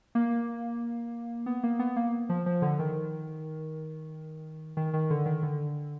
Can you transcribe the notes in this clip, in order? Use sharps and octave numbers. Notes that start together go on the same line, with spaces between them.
A#3
B3
A#3
B3
A#3
F3
F3
D3
D#3
D#3
D#3
D3
D#3
D3